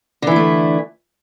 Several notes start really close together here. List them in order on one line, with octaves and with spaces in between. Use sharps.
D3 E3 E4 A3